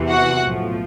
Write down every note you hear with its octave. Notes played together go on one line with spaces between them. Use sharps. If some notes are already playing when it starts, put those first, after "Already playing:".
Already playing: E2 C3 E3
F#4 F#5
B1 A2 F3